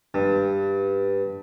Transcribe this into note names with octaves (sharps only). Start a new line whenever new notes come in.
G2